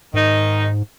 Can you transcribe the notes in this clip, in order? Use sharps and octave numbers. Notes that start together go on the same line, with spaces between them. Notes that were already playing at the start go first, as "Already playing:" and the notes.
G#2 D#3 D#4